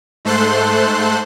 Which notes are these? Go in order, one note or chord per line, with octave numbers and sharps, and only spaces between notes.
G#2 A3 A4 C5 C6 F#6